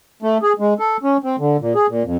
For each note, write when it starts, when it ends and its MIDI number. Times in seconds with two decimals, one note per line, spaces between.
0.22 0.38 57
0.42 0.53 68
0.59 0.74 56
0.79 0.97 69
1.03 1.17 61
1.24 1.36 60
1.39 1.57 50
1.61 1.73 46
1.75 1.87 68
1.89 2.03 46
2.04 2.17 41